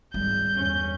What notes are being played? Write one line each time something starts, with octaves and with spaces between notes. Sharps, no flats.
G#1 G3 G6
G1 E2 C#4